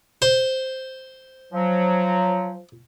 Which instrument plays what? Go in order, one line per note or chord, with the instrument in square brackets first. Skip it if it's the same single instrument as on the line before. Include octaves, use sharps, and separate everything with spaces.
[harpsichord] C5
[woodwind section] F3 F#3